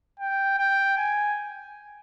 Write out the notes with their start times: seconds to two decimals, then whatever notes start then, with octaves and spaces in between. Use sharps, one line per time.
0.20 G5
0.58 G5
0.97 G#5